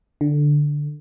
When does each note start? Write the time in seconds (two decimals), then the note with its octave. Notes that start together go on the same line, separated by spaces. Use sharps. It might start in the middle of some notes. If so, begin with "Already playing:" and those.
0.21 D3